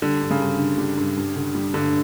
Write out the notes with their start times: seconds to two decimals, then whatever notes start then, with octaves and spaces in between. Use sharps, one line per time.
0.02 D3 G3
0.22 G2
0.31 C#3
0.41 G2
0.59 D3
0.78 G3
0.97 G2
1.17 G2
1.36 D3
1.55 G3
1.74 G2 D3